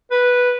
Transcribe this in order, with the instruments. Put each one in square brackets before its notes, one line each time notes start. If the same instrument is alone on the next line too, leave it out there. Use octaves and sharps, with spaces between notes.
[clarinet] B4